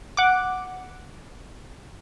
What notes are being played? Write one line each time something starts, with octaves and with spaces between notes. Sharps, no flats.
F#5 D6